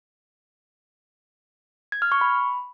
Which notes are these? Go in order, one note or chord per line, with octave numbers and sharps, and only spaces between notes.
G#6
F6
C#6
B5